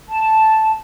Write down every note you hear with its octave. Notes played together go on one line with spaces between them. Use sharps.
A5